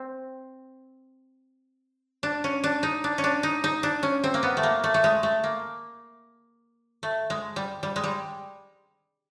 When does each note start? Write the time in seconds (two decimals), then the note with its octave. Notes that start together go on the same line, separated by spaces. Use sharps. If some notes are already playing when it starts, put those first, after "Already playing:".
Already playing: C4
2.23 D4
2.44 C#4
2.64 D4
2.83 D#4
3.04 D4
3.18 C#4
3.24 D4
3.43 D#4
3.64 D#4
3.83 D4
4.03 C#4
4.24 C4
4.34 A#3
4.43 B3
4.57 A3
4.63 A#3
4.84 A3
4.94 A3
5.04 G#3
5.23 A3
5.44 A#3
7.03 A3
7.30 G#3
7.56 G3
7.83 G3
7.96 G#3
8.04 G3